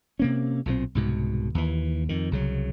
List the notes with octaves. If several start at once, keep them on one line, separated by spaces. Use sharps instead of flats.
C3 A#3 C#4
B1 A#2 D3 C4
C2 G#2 B2
D#2 E3
F2 D#3
C2 C#3 F#3